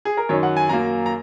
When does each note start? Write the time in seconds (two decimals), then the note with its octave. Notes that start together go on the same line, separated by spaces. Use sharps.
0.05 G#4
0.17 A#4
0.29 F#2 D#3 F#3 C#4 C#5
0.43 F#5
0.57 G#5
0.69 F#2 F#3 A#3 A#5
1.06 A#5